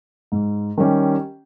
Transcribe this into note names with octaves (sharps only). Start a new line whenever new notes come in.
G#2
D#3 G3 C#4 G4